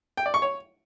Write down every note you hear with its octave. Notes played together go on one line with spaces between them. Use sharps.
G5
D5
C#6
C#5